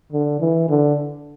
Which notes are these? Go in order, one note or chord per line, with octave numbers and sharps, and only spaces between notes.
D3
E3
D3